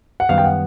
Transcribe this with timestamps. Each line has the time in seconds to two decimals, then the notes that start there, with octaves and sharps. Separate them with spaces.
0.20 F#5
0.29 F#2 D#3 G3 B3 F5
0.38 G5
0.44 F#5